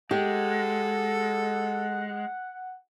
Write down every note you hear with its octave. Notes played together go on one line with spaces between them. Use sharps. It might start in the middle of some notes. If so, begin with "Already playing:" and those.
G#3 G4 A4 F#5